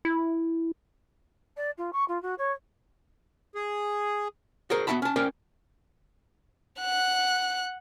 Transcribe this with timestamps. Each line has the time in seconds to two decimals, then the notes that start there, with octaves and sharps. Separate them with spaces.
0.05 E4
1.57 D5
1.78 F4
1.93 C#6
2.08 F4
2.22 F#4
2.38 C#5
3.55 G#4
4.70 F#4 G#4 A#4 C5
4.87 B3 C4 F#4 E5 A5 B5
5.02 C#4 A5
5.16 C#4 A#4 C5 D5 G5
6.80 F#5 F#6